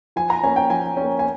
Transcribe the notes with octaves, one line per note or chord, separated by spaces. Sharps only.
F3 G#5
A#5
A#3 C#4 G#5
G5
F3 G#5
C#4
A#3
G#5